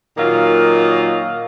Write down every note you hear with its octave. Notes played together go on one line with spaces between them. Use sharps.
A#2 D#3 F#3 A#3 F4 D#5